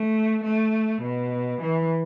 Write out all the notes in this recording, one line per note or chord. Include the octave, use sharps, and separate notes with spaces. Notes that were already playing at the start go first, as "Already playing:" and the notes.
Already playing: A3
A3
B2
E3